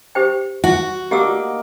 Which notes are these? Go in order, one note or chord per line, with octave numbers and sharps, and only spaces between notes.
G4 C5 G5
F#4
A#3 D#4 G4 F#5 D6 E6